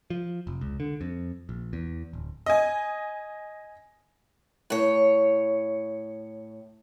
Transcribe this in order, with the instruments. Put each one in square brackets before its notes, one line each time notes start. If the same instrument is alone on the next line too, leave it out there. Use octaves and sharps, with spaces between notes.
[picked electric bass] F3
F1
C#2
D3
F2
A#1
E2
D1
[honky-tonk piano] D#5 G#5
[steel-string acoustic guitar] A2 C#5